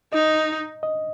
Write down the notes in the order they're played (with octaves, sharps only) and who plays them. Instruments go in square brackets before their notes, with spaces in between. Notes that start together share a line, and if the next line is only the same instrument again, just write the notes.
[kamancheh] D#4 [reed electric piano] D#5
[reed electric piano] D#5